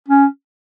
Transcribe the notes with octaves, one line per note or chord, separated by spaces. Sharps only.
C#4